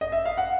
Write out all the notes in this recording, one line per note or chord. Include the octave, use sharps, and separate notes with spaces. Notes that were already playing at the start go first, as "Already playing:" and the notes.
D#5
E5
F5
F#5